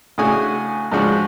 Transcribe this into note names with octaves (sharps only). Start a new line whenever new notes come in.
A2 C#3 D4 F#4 G#5 D#6
G#2 C#3 F3 D4 F#4